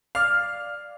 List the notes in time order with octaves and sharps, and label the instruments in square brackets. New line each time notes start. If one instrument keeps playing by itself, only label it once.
[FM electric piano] D5 F5 [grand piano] F6